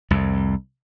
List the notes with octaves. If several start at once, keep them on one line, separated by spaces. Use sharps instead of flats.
C2 F2